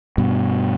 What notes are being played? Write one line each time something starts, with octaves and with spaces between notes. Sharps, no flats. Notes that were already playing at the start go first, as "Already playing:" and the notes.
G2 B2